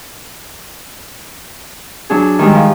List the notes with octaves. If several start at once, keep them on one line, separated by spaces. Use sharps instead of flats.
F#3 D4 G#4
D#3 G3 G#3
F3